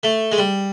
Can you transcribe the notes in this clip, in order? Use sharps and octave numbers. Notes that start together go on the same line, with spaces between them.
A3
G#3
G3